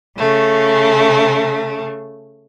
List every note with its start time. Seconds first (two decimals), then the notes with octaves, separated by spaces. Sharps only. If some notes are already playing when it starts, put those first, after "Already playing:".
0.17 C#3 A3